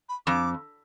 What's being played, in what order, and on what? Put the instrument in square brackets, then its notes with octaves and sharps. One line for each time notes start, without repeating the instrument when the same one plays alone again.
[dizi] B5
[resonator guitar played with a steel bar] F2 [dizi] D6